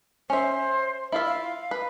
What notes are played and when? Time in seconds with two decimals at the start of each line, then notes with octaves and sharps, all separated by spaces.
0.30 C#4 C5 E5
1.12 E4 F4 E5
1.26 F5
1.71 B4